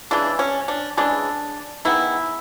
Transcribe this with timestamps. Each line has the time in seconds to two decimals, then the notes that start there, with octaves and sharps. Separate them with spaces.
0.11 C#3 E3 G#3 D4
0.39 C#4
0.68 D4
0.97 C#3 E3 G#3 D4
1.85 D#3 G#3 B3 E4